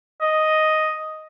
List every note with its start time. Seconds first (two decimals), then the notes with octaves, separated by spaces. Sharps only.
0.21 D#5